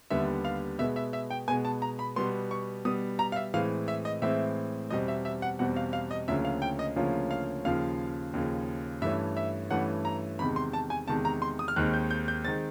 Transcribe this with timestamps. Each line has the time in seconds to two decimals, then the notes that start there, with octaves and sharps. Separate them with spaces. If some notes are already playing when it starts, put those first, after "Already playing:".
0.10 D#2 D3 G3 B3 E5
0.45 F5
0.79 B2 G#3 B3 E5
0.96 E5
1.13 E5
1.30 G5
1.48 B2 G#3 B3 G#5
1.65 A5
1.82 A#5
1.99 B5
2.16 B2 G3 B3 C6
2.51 C#6
2.85 B2 G3 B3 D#6
3.19 A#5
3.32 F5
3.36 E5
3.54 A2 E3 G#3 C4 F5
3.88 E5
4.05 D#5
4.22 A2 E3 G#3 C4 E5
4.90 E2 B2 G3 C4 D#5
5.08 E5
5.25 E5
5.42 F#5
5.59 E2 B2 G3 C4 F#5
5.76 F5
5.93 F5
6.11 D#5
6.28 D2 C#3 F3 A#3 C#4 E5
6.45 F5
6.62 G5
6.79 D#5
6.96 D2 C#3 F3 A#3 C#4
7.31 F5
7.65 D#2 C#3 F3 F5
8.33 D#2 C#3 F3
9.02 G2 E3 A3 C#4 E5
9.37 E5
9.71 G2 E3 A3 C#4 F#5
10.05 A#5
10.39 E2 C3 D#3 G#3 B5
10.56 C6
10.73 A5
10.90 G#5
11.08 E2 C3 D#3 G#3 A5
11.25 A#5
11.42 C6
11.59 D#6
11.68 F6
11.76 D#2 D#3 G#3 C4 F#6
11.94 G6
12.11 G6
12.28 G6
12.44 D#3 G#3 C4 A6